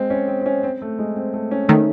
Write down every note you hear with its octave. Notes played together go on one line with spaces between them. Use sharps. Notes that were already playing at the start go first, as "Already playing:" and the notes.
Already playing: G#3 C4
C#4
C4
C4
C#4
C4
A3
G#3
C4
A3
C#4
D#3 A3